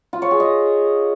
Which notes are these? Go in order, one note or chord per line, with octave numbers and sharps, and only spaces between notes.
F4
C#5
G#4
D#5